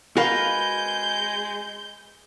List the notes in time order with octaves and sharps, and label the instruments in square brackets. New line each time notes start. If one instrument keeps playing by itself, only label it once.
[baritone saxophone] G#3 [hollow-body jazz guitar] F#4 A#4 F5 [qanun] B4 [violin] G6